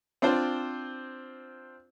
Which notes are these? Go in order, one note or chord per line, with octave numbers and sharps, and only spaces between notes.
C4 D4 F4 C5